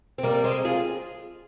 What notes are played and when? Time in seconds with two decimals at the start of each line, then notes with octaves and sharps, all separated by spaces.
0.18 C4
0.23 G3 A#3
0.44 G#3 C4
0.65 F4 G#4